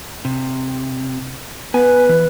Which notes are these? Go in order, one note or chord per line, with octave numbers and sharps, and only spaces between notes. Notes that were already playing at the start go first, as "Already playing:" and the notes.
C3
B3 B4 G#5
E3